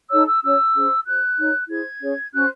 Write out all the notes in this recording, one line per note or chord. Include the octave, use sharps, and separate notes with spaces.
D#4 A4 C#5 E6
E6
C#4 F#4 C#5 E6
C#4 G#4 C5
F#4 C5 F#6
D#4 F#4 C#5
E4 G#4 C5 G#6
C#4 G#4 C#5
C#4 F#4 C5 F#6